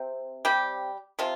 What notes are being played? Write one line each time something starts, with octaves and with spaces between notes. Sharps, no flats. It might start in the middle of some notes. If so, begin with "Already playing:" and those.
Already playing: C3 C4
G3 G4
C3 F3 F4